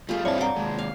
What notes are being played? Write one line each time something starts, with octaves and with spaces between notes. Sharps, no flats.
G3 A3 F4 G#4
G2 C4 E4 C#5 D5 A5 B5
D5 F#5 G5 A#5 D6
D#2 G#3
F5